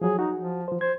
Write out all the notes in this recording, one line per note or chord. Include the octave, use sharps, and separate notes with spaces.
F3 F#3 G#4
D#4 F#4
F3
F3 C5
C5 G#6